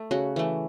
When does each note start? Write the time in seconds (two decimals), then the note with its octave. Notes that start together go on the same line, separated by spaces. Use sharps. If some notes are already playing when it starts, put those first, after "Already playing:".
Already playing: A3
0.11 C#3 F#4
0.36 E3 A3